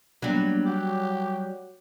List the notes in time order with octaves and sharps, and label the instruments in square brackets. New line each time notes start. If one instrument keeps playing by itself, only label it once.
[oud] F#3 G3 [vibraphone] A#3 B3 D4
[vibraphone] F#4 C#5 F#5 [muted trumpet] G4